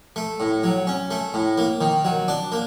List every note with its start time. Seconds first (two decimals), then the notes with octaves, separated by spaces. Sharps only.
0.16 A3
0.40 A2
0.64 F#3
0.87 C#4
1.11 A3
1.34 A2
1.58 A#3
1.81 D#3
2.05 F#3
2.28 D4
2.52 A#3